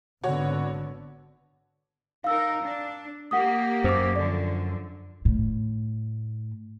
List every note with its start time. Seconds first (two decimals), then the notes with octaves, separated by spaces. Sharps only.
0.24 G#1 D3 B3 F#4 C#5
2.24 D#4 A#4 F5 E6
2.61 D4
3.31 A#3 G4 F#5 D#6
3.84 F#2 C5 D6
4.16 D3 F3 D5
5.25 A2